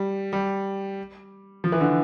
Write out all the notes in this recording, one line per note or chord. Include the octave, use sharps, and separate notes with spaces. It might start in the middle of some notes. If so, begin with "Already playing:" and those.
Already playing: G3
G3
F3
E3
D3